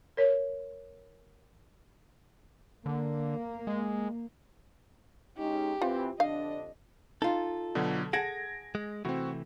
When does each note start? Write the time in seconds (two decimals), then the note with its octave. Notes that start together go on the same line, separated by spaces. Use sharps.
0.17 A#4 C#5
2.86 D3 A#3
3.67 G#3
5.38 G#3 C#4 D#4 G4
5.82 E3 C4 F4
6.20 F2 D3 D4 D#5 F5
7.22 D#4 F4 A4
7.75 B2 D3 F#3
8.13 G#4 F#5 A5 G#6 A#6 D7
8.75 G#3
9.05 C3 E3 A3 C4 F#4